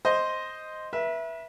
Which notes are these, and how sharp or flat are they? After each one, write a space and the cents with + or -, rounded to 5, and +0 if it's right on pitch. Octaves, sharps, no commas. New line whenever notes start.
C5 +0 D#5 +0
B4 -35 E5 +0